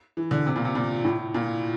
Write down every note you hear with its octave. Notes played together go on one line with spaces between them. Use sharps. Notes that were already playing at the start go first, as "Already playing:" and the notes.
E3
D3
C3
A#2
C3
A#2
A2
A#2